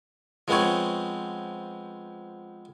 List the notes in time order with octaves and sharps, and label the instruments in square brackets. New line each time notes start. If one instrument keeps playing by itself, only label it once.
[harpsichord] F3 G#3 B3 C4 C#5